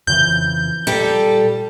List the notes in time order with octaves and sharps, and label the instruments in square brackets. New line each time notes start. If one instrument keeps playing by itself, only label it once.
[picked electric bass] F2 C#3 E3 [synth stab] G6
[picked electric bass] A#2 [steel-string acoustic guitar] G3 G4 A4